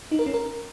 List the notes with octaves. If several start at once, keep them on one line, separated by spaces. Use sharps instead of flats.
D#4
A#4
C#4
A#4